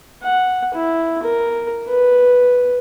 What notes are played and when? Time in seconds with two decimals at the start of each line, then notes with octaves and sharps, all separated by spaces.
0.23 F#5
0.74 E4
1.22 A#4
1.88 B4